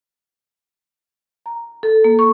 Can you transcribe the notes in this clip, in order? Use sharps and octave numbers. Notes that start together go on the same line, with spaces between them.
A#5
A4
A#3
C#6